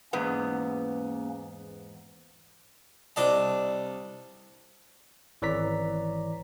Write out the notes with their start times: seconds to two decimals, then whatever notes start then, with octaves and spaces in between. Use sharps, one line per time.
0.13 E2 G#2 A#3 B3 C#4
3.16 C2 D4 D#5 A5
5.42 G#1 E3 C#5 D5 A#5 B6